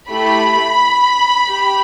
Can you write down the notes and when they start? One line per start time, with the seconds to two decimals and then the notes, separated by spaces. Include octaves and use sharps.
0.11 A3 E4 G4 B5
1.50 G4